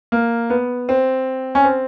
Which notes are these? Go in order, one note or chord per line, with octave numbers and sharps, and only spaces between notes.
A#3
B3
C4
C#4
C4